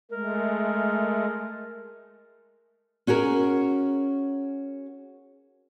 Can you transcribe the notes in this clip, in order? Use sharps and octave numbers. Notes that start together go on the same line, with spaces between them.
G#3 A3 A#4
C#4 F#4 G#4 A#4